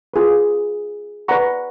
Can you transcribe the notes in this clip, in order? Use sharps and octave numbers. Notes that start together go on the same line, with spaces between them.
F4 G#4 B4
B4 D5 F#5 A#5 C#6